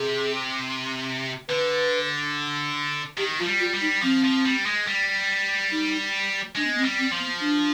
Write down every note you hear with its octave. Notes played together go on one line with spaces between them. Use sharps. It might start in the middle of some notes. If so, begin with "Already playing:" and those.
Already playing: C3 G#4
D3 B4
D#3 G4
F3 F4
G3
F4
G3
D#4
F3 C4
F3
G3
G#3
G3
D#4
G#3 D4
B3
C4
G3
C4
F3
B3
D4